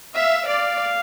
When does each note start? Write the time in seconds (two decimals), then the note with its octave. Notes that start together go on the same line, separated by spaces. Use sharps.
0.15 E5 F5
0.47 D5 F5